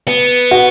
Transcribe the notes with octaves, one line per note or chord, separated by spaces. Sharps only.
B3
F#4